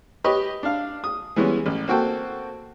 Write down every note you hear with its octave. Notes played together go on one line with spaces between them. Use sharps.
G4 B4 C#5 D#5
D4 F5
D#6
E3 G3 G#3 B3 C#4
A1
A#3 C4 F#4 A4 G5